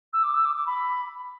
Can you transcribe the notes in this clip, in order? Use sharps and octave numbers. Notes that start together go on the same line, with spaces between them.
E6
D6
E6
D6
D6
B5